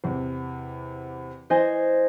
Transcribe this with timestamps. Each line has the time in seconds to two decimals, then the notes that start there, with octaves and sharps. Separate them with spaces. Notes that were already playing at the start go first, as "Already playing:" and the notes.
0.04 E2 C3
1.50 E3 C5 D#5 G#5